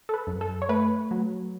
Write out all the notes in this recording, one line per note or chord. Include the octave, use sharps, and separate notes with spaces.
A4
B4
F#2
A4
C#5
A3 B4
F#3